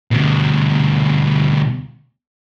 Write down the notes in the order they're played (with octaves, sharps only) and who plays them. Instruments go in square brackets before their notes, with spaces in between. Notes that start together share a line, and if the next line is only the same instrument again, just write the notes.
[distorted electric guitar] D2 B2